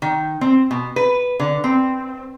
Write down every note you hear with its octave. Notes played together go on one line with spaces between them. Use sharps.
D#3
C4
B2
B4
D3
C4